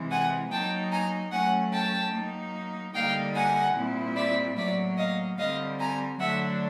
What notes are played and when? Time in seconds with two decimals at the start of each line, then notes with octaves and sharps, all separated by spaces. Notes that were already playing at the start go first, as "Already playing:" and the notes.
Already playing: C3 E3 G#3
0.11 F#5 G#5
0.51 F#3 A#3 D#4 G5 A5
0.91 G#5 A#5
1.32 F#3 A3 C#4 F#5 G#5
1.72 G5 A5
2.14 F#3 A#3 D#4
2.94 D3 G3 A#3 D#4 F5 G5
3.35 F#5 G#5
3.75 A#2 G3 C4 E4
4.16 D5 E5
4.57 A2 F#3 A#3 D5 E5
4.97 D#5 F5
5.38 D3 G3 C4 D#5 F5
5.79 G#5 A#5
6.19 D3 F#3 A3 D4 E5 F#5